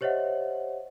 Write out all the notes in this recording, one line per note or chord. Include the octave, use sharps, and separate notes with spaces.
G4 C5 C#5 D#5 E5 F#5